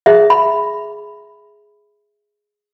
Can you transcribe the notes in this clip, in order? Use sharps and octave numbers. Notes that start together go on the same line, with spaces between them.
G#4 E5
B5